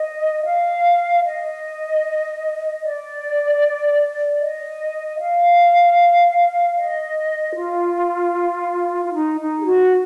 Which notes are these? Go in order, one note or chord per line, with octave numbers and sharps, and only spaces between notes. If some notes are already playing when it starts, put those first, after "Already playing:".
Already playing: D#5
F5
D#5
D5
D#5
F5
D#5
F4
F4
D#4
D#4
G#4
F#4